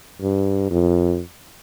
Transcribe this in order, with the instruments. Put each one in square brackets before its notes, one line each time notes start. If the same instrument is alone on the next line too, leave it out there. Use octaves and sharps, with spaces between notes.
[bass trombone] G2
F2